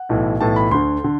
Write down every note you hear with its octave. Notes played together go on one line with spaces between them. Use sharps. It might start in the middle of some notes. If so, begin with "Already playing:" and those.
Already playing: F#5
B1 A2 E3
B1 A2 E3 A5
B5
D2 D3 C6
D3